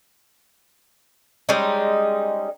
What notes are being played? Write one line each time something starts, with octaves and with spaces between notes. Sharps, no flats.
G3 G#3 C#4 D#4